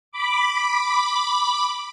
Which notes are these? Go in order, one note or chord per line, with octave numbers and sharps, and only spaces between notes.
B5 D6